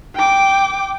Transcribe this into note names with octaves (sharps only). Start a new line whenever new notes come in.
G5 D6